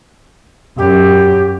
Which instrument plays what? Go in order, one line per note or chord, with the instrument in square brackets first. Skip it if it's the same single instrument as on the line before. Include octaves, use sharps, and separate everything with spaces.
[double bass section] F#2 [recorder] G4